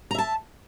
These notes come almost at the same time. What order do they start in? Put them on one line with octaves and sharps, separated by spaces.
A#5 E5 A5